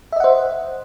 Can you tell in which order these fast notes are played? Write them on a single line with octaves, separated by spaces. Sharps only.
E5 D#5 F#5 C5